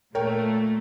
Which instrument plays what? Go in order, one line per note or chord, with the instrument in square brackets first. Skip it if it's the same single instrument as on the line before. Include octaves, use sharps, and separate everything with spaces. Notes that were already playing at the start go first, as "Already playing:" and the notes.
[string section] A#2 A3 [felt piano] A#4 C#5 G5